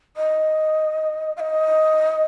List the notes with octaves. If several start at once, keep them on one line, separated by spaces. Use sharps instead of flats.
D#5
F5
D#5